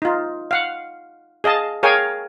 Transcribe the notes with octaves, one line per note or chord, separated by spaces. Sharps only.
D#4 F4
F5 F#5
G#4 D#5 F5 A5
G#4 A#4 C#5 F5 G5 G#5